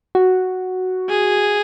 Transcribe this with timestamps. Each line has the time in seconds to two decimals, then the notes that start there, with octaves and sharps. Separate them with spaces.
0.15 F#4
1.09 G#4